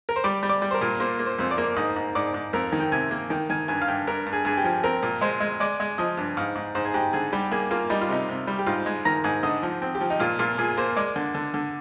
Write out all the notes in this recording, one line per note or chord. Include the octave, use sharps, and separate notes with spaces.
A#4
C5
G3 D5
G3
D5
G3
C5
A#4
A#2
A#3 C5
A#3
C5
F2 C5
D5
A#3
G#2 D#5
G#2
G#2 D5
G#2
F2 A#4
D#3
G5
C3 G#5
A#3
D#3 G5
D#3 G#5
G2 G#5
F5
G2 G5
G2 A#4
G2
G#4
G2 G#4
G4
F3
C4 A#4
A#2
G#3 C5
G#3
G#3 D5
G#3
F3 D#5
G2
G#2 F5
G#2
G#2 C5
G#4
G#2 G4
D3 G#4
G3 G4
A#3 G#4
A#3 F4
G3 D#4
F4
C3 D#4
C3
G3
G4
G#2 F4
G#3
D#3 A#5
G#2 G#5
D3 D#5
F3
C4
G4
F3
D#4
A#2 F4
A#2 F4
A#2 G#4
A#3 C5
G#3 D5
D3
D3
D3